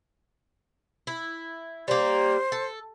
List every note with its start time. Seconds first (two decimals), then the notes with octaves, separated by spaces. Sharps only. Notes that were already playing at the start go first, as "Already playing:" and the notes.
1.07 E4
1.88 G3 A#3 C5
2.52 A4